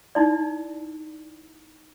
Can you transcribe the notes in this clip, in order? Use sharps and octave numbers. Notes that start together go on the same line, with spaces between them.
D#4 E4 D5